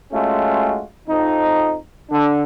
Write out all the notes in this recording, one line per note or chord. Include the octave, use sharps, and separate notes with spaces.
G#3 A3 C#4 F4 F#4
F2 D#4
D3 D4